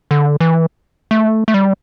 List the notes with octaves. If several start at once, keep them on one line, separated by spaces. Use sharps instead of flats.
D3
E3
A3
A3
G3